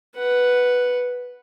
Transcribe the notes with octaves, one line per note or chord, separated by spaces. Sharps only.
B4 F#5